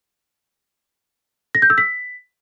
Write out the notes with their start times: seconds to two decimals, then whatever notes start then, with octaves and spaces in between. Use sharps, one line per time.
1.55 A#6
1.62 G6
1.70 E6
1.78 B6